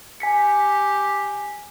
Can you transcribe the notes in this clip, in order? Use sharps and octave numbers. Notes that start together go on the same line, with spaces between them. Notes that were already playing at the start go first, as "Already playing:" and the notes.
G4 G#5 B6 C#7